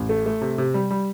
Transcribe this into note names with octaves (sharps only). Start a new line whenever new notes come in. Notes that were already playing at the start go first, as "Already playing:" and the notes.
Already playing: A1
A3
A3
C3
C3
G3
G3